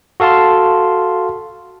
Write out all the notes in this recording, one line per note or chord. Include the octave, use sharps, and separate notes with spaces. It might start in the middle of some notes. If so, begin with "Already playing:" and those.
F#4 A4 F5 A5 C6